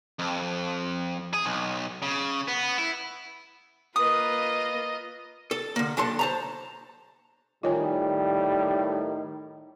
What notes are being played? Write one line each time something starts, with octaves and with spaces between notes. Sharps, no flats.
F2
G#4
B1
C#3
B3
E4
A#3 F4 B4 D#5 D#6
A4
D3 A#3
B1 D4 A4 A5 C6
C5 A5 A#5
A2 D#3 G3 F4 C#5 G#5